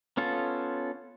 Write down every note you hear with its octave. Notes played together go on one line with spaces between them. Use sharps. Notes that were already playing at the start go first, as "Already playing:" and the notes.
B3 C#4 F4 A4